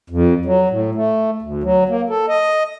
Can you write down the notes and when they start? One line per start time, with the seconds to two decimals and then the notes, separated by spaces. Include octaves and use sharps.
0.10 F2
0.45 F#3
0.70 A2
0.95 A3
1.42 D2
1.64 F#3
1.89 A#3
2.10 A4
2.29 D#5